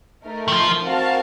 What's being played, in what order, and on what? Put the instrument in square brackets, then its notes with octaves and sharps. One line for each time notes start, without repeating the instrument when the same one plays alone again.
[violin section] A3 D#4 A#4
[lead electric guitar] D#3
F3
[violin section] C4 F#4 A#4 F5 A5